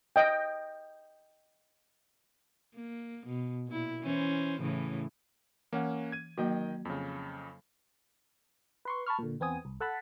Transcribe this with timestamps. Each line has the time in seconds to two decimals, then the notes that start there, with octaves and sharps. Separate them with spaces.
0.16 D#5 G5
2.74 A#3
3.26 B2
3.67 A#2 E4
4.02 E3 C#4 C5
4.61 A2 C#3 E3
5.73 E3 A#3 C#4 F#5
6.12 G#6 D#7
6.38 D#3 F#3 A#3 F#4 D#5 G5
6.85 F2 C#3
8.85 B4 C6 C#6
9.06 A5 B5 C#6 F6
9.19 A#2 D3
9.40 E2 B3 C4 G#5 D#6
9.65 C2
9.80 A4 F#5 A5 B5